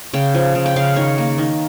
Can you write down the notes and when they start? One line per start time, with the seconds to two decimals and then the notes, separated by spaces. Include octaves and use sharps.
0.13 C#3 G5
0.35 F3
0.55 C#3
0.66 G5
0.76 C#3 F5
0.96 D#3 C#5
1.18 A#3
1.38 D#3